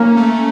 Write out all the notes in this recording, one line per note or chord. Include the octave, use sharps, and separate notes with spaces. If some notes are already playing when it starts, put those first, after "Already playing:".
Already playing: A#3 C#4
A3